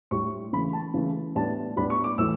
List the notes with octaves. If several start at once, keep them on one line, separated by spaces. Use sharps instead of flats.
A2 G3 D4 C#6
C#3 E3 A3 B5
A5
C#3 E3 A3
A2 G3 B3 D4 A5
A2 G3 B3 D4 B5
C#6
D6
A2 E3 A3 E6